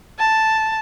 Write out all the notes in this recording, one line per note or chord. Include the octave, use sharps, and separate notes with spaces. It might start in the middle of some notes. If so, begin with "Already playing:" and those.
A5